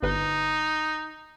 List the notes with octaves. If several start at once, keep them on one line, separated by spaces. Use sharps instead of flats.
G1 D#4 B4